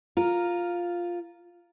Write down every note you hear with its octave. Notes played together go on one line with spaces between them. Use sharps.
F4 A#4